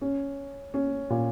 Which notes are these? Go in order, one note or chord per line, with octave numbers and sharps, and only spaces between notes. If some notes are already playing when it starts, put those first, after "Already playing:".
C#4
C#4
A#2